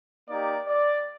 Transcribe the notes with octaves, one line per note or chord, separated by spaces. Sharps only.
A#3 D#4 G4 D5
D5